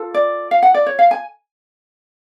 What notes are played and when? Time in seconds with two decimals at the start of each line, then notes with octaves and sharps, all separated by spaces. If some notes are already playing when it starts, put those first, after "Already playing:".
Already playing: F4 A4
0.14 D5
0.51 F5
0.63 F#5
0.74 D5
0.86 C#5
0.99 F5
1.11 G#5